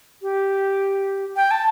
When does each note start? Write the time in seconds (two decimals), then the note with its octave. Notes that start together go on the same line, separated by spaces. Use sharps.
0.22 G4
1.36 G5
1.51 A5